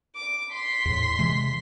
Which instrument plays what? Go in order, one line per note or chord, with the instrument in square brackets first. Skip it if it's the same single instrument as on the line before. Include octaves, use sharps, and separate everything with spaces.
[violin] D6
C6 B6
[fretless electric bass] E2 A2
C3 E3 G#3